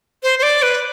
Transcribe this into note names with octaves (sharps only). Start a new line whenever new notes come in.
C5
C5
D5
B4